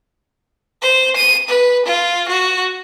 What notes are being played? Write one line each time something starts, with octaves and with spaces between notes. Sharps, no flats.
C5
D#7
B4
F4
F#4